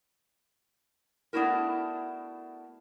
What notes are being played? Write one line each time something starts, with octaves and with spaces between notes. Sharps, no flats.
A3 B3 D4 E4 F#4 A#4